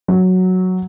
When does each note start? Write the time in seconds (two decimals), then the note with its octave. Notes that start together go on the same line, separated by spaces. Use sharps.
0.08 F#3